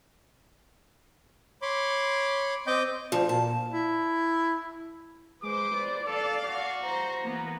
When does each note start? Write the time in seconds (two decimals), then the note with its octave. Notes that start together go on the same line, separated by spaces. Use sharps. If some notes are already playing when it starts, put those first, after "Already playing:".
1.62 C#5 B5 C6 D6
2.67 C4 D#5 G5 D6 G6
3.12 D2 F3
3.29 A#2 A5
3.73 E4
5.43 G#3 B4 C5 D6
5.74 D5
6.07 A4 F5
6.46 F#4
6.84 C5 A#5
7.23 E3 A#3 B3